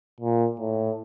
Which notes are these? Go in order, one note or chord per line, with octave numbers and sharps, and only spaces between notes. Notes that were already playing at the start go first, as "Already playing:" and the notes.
A#2
A2